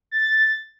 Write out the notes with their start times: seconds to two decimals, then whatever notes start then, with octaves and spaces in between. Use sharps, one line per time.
0.11 A6